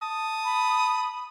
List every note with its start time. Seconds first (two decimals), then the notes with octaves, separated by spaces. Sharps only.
0.02 A5 D#6
0.45 B5